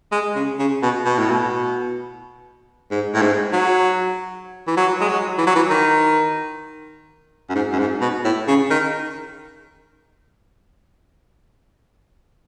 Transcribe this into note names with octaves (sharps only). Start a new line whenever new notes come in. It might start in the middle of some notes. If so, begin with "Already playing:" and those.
G#3
C#3
C#3
B2
B2
A2
B2
G#2
A2
G#2
F#3
E3
F#3
G#3
F#3
E3
F#3
E3
D#3
F#2
G#2
F#2
G#2
B2
A2
C#3
D#3